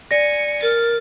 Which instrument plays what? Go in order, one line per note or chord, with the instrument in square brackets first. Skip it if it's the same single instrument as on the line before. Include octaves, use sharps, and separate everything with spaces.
[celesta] D5 A#6 [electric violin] G#5 C#7
[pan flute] A#4 [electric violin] A6